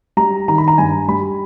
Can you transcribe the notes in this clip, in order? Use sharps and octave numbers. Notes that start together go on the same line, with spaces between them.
G3 A#5
D#3 A#5
B5
A#5
G2 G#5
G3 B5